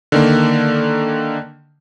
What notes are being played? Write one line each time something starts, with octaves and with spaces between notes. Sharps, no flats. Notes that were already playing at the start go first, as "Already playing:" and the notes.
D3 D#3 A#3